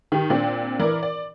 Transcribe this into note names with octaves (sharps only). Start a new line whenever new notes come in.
D#3 G4
A#2 C4 D4
E3 A#4 D5
D5